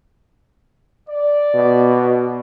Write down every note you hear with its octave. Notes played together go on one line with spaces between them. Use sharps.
D5
B2